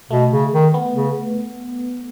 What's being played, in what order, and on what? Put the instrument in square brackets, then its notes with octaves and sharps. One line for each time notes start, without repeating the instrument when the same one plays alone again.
[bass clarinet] B2 [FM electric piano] A3
[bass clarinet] C#3
D#3
[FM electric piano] B3
[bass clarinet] C#3